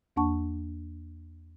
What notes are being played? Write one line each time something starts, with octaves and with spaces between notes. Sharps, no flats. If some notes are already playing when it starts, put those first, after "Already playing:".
E2 A#3 D4 F#5 A5 C#6